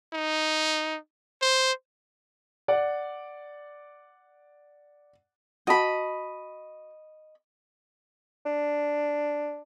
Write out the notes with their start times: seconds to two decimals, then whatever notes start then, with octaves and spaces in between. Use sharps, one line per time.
0.13 D#4
1.42 C5
2.68 D5 F#5
5.67 F#4 D#5 G5 A5 B5
8.46 D4